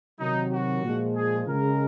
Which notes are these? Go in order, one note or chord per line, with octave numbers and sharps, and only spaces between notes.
C3 D#3 F#3 D#4
F#4
A#2 F3 G#3
G#4
C#3 G#3 A#4